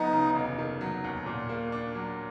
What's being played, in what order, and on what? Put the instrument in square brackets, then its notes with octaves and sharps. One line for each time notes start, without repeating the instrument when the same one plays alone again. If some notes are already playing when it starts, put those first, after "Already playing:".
Already playing: [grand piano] D2 F#3 B3 [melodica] D#4
[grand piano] C#3
F1
D#3
F#3
D#2
A#2
A#3
D4
F#3